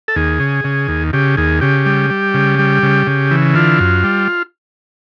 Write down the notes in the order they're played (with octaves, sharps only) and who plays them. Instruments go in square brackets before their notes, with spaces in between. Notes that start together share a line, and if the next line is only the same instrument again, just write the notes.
[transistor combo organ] A4
D#2 G#4
C#3
C#3
D#2
C#3 G4
D#2 G#4
C#3 G4
G3
G3
C#3
G3
C#3
C#3
E3
D3 F4
F#2
G3